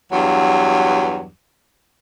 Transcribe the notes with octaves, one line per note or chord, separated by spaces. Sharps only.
E2 G2 F#3